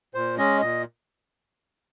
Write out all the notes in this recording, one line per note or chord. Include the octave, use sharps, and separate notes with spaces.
A#2 C5
G#3 C#4 D#5
A#2 D#5